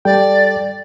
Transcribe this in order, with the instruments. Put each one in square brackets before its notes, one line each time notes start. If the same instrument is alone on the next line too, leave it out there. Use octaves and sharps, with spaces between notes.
[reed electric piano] G3 A4 G5 [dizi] D5